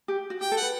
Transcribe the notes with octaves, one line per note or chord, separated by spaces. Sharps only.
G4
F#4
G4 G5
A4
F#5
B4